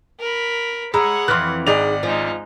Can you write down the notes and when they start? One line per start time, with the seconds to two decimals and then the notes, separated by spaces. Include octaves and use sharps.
0.19 A#4 B5
0.94 G#3 C#5 F#5 A#5 B5 E6
1.28 F2 E3 C6 F6 F#6
1.67 G#1 D#4 G#4 D5 F#5 F7
2.03 F3 G#3 D#4